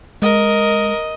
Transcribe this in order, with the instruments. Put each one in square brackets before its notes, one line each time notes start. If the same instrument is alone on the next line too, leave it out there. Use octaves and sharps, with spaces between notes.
[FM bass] G#3 [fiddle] A#4 [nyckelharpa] D#5